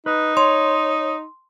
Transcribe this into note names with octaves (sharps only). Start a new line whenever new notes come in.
D#4 B4
C#5 C6